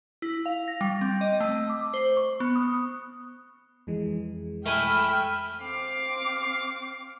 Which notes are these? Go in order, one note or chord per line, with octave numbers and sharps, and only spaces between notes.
E4
F5
A#6
G3
C4
D#5
A3
D6
C5
C#6
B3
D#6
F2 E3 G#3
A3 E4 G5 G#5 B5 E6 F6
C4 F5 D6